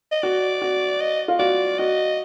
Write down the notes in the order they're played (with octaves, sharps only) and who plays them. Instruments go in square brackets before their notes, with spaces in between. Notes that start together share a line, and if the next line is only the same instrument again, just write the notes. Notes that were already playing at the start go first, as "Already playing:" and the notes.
[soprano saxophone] D#5
[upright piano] F#4 [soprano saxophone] D5
[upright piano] F#4
[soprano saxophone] D#5
[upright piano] F4
[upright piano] F#4 [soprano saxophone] D5
[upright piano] F#4 [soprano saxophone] D#5